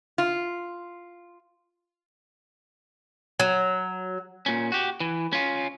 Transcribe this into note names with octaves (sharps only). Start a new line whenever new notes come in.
F4
F#3
A#2 C#4
F#4 G4
E3
C#4 F4